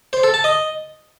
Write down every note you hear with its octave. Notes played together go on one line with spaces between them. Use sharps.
C5
A4
A5
D#5